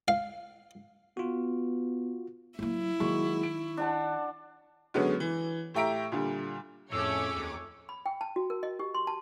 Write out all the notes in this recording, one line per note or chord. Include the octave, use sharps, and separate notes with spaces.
F5
B3 F4 F#4
F#3 A#3 E4
D#3 F#3 G#3 A#3 C#6
D7
D4 F#5 A5
F#2 D3 G#3 B3 C#4
E3
A2 G4 E5 A#5 D7
A#2 D3 G3
F2 A2 A3 C#4 G#4 C#5 D6 E6
D#2
B5
G5
A5
F#4
A#4
D#5
G4
C6
A5